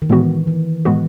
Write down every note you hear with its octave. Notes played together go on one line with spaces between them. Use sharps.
D#3
A2 E3 G#3 B3 F#4
E3
A2 E3 G#3 B3 F#4